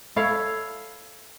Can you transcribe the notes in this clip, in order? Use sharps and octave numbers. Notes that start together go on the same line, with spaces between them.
E4 A4 C#5 F5